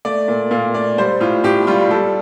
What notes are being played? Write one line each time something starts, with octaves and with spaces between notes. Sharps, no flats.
A3 D5
A#2
A#2 F5
A3 D5
G3 C5
A2 F4
A2 G4
G3 F4
G3 A4